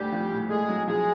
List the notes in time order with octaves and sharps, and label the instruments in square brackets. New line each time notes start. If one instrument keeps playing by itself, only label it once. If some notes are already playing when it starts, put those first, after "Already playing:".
Already playing: [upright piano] D2 [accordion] G3 G4
[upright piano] F3
A2
[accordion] G#3 G#4 [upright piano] A3
[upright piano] F#3
[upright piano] F3 [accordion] G#3 G#4